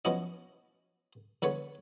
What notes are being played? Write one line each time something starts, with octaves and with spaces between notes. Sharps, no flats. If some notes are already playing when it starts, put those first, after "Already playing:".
F3 B3 C#4 E4 F#4 D#5
E2 D3 B4 C#5